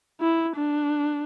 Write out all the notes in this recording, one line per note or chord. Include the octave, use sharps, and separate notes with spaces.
E4
D4